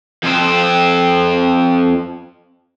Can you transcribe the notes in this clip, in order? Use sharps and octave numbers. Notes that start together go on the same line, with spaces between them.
F2 C4